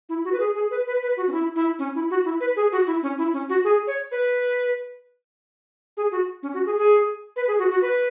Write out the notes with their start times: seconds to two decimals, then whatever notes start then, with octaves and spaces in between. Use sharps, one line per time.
0.09 E4
0.25 F#4
0.32 B4
0.40 G#4
0.55 G#4
0.71 B4
0.87 B4
1.02 B4
1.17 F#4
1.27 C#4
1.32 E4
1.56 E4
1.79 C#4
1.95 E4
2.10 F#4
2.25 E4
2.40 B4
2.56 G#4
2.72 F#4
2.87 E4
3.03 C#4
3.18 E4
3.33 C#4
3.49 F#4
3.64 G#4
3.87 C#5
4.11 B4
5.97 G#4
6.11 F#4
6.43 C#4
6.54 F#4
6.66 G#4
6.78 G#4
7.36 B4
7.47 G#4
7.59 F#4
7.70 F#4
7.82 B4